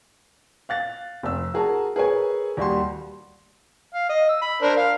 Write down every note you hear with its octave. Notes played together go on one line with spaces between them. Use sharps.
F5 F#6 A6
F1 E6
F#4 G#4 A#4 A5
G#4 A#4 B4 C#5 G#5
D#2 G3 F#4 C6
F5
D#5
E6
B5
D4 A#4 C5
F5